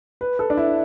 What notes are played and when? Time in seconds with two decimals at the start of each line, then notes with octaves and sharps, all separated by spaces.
0.21 B4
0.39 A4
0.50 D4
0.57 E4